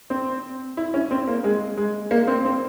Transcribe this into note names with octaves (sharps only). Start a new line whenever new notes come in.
C4
E4
C#4
C4
A#3
G#3
G#3
A#3
C4
C4